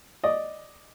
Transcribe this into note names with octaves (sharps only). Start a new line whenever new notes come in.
D5 D#5